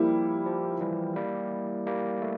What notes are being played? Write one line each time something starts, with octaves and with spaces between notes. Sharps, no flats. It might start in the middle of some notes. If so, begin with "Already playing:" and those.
Already playing: F3 G3 A#3 E4 G4
F3
E3 G3
G3 A#3
G3 A#3
A3